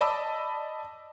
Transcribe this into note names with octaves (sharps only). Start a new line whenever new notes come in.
D5 D#5 A5 B5 D6 E6